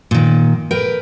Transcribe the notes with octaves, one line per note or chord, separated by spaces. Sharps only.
A#2 D#3
A#4 B4 G5